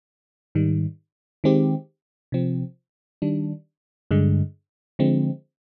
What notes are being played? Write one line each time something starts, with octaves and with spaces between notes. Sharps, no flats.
G#2 D#3 G3
D#3 G#3 C4 G4
C3 F3 C4
D#3 G3 D4
G2 D3 G#3
D3 F3 G#3 C4